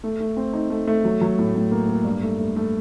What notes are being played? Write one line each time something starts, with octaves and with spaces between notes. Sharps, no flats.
A3
A3
C4
D#4
A3
A3
F#3
F#3
A2
A2
A#3
A#3
G2
A3
A3
A3